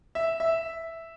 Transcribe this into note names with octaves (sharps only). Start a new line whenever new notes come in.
E5
E5